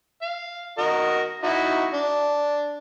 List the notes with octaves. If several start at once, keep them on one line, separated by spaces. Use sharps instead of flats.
F5
F#4 A#4 D#5
D#4 E4 F#4
D4